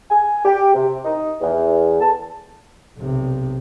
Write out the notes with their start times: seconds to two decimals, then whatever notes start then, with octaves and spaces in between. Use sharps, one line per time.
0.10 G#5
0.45 G4
0.74 C3
1.04 D#4
1.41 E2
2.00 A5
2.98 B1 C3